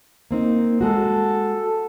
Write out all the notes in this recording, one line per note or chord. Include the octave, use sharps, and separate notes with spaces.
A#3 C4 D#4
G#3 F#4 A4